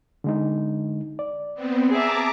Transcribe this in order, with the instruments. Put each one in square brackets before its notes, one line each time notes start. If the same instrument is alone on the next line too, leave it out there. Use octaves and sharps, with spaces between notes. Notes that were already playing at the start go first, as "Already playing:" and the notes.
[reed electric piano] D3 G#3 D#4
D5
[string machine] B3 C4
[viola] G#4 E5 [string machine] A5 A#5 D6